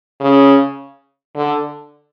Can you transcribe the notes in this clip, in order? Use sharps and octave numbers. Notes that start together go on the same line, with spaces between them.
C#3
D3